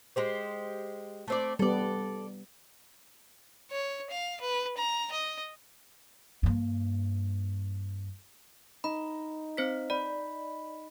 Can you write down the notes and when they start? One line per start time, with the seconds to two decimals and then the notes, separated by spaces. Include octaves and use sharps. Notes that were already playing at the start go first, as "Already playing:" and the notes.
0.16 G#3 G4 C5
1.28 A3 C4 D5
1.59 G3 B3 A4 D5
3.71 C#5
4.10 F5
4.41 B4
4.77 A#5
5.12 D#5
6.43 G2 A#3
8.84 D#4 B5
9.57 C4 C5 B6
9.90 D5 B5